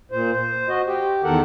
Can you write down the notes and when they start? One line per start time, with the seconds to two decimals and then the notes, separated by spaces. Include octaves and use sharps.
0.12 A#2 C5
0.32 C5
0.69 F#4 D#5
0.87 G4
1.24 E2 D#3 A4 A#4 F#5